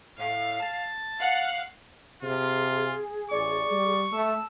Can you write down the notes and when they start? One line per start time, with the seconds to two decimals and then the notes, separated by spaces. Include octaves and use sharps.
0.17 A2 F5
0.60 A5
1.20 F5 F#5
2.23 C3 F4 G#4
3.31 A1 D5 C#6
3.71 G3
4.12 A3 A5 E6